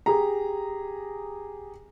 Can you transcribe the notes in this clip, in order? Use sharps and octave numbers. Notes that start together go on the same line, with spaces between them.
G4 G#4 A#5